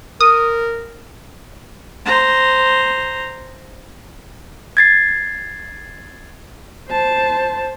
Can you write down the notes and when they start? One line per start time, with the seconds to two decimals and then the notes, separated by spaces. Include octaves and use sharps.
0.21 A#4 D#6
2.05 C5 A#5
4.77 G#6 A6 C7
6.90 C5 A5